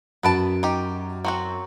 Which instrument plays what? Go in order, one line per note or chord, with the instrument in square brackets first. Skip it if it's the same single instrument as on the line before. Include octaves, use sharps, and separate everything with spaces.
[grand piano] F#2 D7 [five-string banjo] B3 B4 A5
[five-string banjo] D#4 G4
F#3 C4 F#4